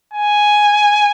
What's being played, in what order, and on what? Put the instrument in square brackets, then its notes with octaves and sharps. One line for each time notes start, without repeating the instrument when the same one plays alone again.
[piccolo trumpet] G#5